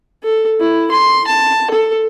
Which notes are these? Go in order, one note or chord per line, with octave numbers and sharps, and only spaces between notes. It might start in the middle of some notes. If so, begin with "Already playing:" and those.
A4
E4
C6
A5
A4